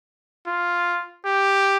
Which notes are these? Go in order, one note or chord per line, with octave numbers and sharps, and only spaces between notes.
F4
G4